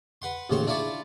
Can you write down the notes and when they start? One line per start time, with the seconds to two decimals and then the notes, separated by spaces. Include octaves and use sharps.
0.22 B4 F#5 C6
0.50 A1 D#2 C#3 C5 C6 C#6
0.67 D4 E4 F4 D5 C#6